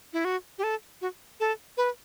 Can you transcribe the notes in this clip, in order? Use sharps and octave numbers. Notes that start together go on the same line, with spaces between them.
E4
F#4
G4
A4
F#4
A4
B4